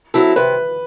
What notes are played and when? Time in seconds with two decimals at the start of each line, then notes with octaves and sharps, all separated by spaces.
0.14 F#3 C4 E4 A4
0.36 C3 B4